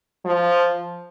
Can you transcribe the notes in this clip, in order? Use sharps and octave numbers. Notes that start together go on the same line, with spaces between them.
F3